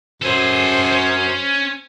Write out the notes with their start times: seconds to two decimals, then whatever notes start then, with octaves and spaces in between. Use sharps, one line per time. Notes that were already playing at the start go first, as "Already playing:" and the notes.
0.22 F#2 G#4 A4 C5
0.92 C#4